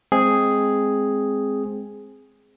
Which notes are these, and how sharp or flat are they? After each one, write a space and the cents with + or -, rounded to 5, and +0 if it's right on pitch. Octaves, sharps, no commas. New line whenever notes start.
G#3 +0 C4 +0 G#4 +0